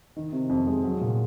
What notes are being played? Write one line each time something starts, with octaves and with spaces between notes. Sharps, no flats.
D#3
C3
F2
G#3
F#3
A#2